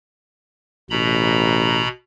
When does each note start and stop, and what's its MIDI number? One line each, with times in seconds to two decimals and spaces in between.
0.90 1.82 33
0.90 1.88 47
0.90 1.88 82
0.90 1.88 83